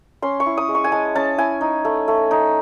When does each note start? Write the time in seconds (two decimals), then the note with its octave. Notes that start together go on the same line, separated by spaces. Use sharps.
0.22 C#4 C6
0.40 C#6
0.46 E4
0.57 D#6
0.69 G#3
0.75 C#6
0.84 G#5
0.92 G#3 A5
1.15 C#4 A5
1.38 E4 G#5
1.61 D#4
1.85 A3
2.08 A3
2.31 D#4